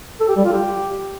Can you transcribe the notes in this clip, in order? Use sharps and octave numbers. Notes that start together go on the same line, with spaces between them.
A4
G4
G3
F4
G4